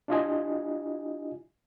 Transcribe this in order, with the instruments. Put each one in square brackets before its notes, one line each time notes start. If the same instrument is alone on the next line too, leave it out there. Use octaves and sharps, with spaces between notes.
[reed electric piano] D4 E4 F4 G4 D#5 G#5